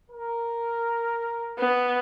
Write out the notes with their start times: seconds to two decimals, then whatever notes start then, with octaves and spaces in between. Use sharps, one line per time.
0.11 A#4
1.59 B3